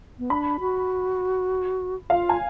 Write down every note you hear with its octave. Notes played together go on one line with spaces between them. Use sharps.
B3
D4 B5
F#4
F4 F5
G#5